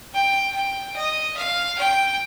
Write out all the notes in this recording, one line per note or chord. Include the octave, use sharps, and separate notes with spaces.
G5
G5
D#5
F5
G5